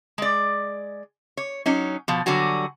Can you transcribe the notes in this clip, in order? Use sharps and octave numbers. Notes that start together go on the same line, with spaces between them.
G#3 D5
C#5
F#3 C#4 D#4
B2 F3
D3 F#3 G3 F#4 G#5